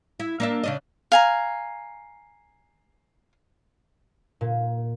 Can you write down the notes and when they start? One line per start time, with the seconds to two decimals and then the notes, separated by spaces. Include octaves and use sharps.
0.20 E4
0.40 A#3 D4 E5
0.64 C#3 D4 D#5
1.12 F5 G#5 A#5
4.41 A#2